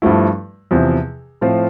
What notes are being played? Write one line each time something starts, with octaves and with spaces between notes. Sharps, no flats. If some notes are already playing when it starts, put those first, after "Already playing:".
G2 F3 A3 E4
E2 C3 F3
A2 F3 C4 F4